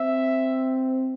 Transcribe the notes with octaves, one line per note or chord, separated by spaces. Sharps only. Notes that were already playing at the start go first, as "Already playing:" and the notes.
Already playing: C4 E5